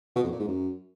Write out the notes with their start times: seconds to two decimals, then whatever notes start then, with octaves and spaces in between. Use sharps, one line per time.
0.16 B2
0.24 F2
0.31 A#2
0.39 G#2
0.47 F#2